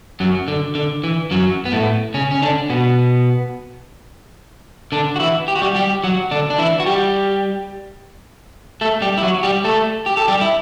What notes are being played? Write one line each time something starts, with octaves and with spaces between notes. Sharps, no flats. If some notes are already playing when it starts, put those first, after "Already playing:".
F#2 F#3
D3
D3
E3
F#2 F#3
B3
A2 A3
C#3 C#4
C#4
D3 D4
B2 B3
D3 D4
F#4
E3 E4
G4
F#4
G3 G4
G3 G4
F#3 F#4
D3 D4
D4
E3 E4
F#4
G3 G4
A3 A4
G3 G4
E4
F#3 F#4
G3 G4
A3 A4
G4
A4
G3 G4
E4